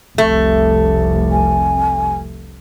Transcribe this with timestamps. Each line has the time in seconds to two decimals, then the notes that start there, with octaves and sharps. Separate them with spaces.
0.18 F1 C2 A3
1.32 G#5